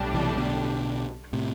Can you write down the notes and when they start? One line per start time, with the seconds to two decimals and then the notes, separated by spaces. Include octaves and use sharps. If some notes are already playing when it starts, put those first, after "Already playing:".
Already playing: B1 A2 G3 D4 G4
0.14 C3 E3
0.37 B2 D3
1.33 A2 C3